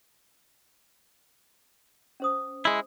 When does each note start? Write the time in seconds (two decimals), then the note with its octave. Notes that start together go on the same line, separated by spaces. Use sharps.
2.20 C#4 C5 D#6
2.65 G#3 E4